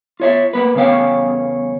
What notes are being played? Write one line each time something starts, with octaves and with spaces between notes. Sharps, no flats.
F4 C#5 E5
A#3 B4
E2 C#3 C#4 C#5 F5 G5